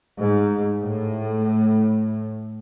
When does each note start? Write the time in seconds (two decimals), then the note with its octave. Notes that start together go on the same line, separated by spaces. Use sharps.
0.19 G#2
0.82 A2